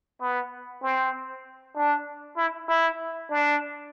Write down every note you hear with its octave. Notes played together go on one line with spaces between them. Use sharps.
B3
C4
D4
E4
E4
D4